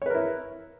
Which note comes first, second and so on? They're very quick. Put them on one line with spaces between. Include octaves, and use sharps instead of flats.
C#5 B4 A#4 E4